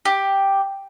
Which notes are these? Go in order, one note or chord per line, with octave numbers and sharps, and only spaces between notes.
G4